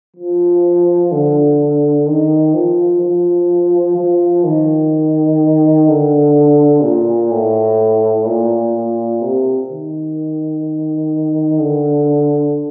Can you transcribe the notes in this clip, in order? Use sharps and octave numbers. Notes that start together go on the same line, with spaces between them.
F3
D3
D#3
F3
F3
F3
D#3
D3
A#2
A2
A#2
C3
D#3
D3